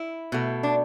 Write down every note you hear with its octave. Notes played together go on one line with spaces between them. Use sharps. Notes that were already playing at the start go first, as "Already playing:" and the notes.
Already playing: E4
B2 A3
D4